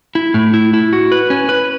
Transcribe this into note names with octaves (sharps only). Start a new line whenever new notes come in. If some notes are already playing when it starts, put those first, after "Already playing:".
E4
A2
E4
E4
F#4
B4
C#4
B4